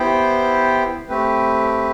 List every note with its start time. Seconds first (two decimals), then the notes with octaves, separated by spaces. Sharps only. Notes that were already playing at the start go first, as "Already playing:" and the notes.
Already playing: B3 E4 G4 C5 G5
1.09 A3 C4 G4 B4